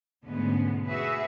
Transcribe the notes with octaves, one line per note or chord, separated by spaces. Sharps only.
D2 G#2 B2 G#3 B3 C#4
F#4 G#4 B4 E5